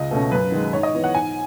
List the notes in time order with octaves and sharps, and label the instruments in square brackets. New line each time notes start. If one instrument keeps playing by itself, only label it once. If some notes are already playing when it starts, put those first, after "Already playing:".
Already playing: [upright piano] C#2 D#5
B2 A3 C#4
F#2 B4
D#3 G#3
G#2 C#5
D#5
E3 B3
F#5
G#2 G#5